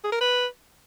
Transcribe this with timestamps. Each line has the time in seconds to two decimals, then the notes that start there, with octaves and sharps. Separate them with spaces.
0.04 G#4
0.12 A#4
0.21 B4